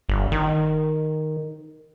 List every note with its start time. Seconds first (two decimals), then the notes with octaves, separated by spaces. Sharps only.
0.09 G1
0.32 D#3